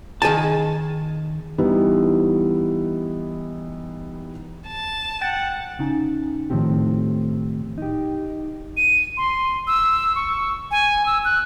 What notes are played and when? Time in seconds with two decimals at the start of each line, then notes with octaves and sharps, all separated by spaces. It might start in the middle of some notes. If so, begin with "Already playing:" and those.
0.22 D#3 G#4 G#5 A5
1.58 E3 G3 B3 D#4 E4
4.67 A5
5.21 F#5 G5 A6
5.79 C#3 D#4 G#5
6.50 A2 D#3 F3 C4 G4
7.78 D#4 G4
8.77 D#7
9.17 C6
9.67 E6
10.16 C#6
10.71 G#5
11.06 E6
11.25 F#6